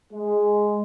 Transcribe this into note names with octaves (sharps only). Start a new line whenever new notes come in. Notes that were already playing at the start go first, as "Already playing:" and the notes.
G#3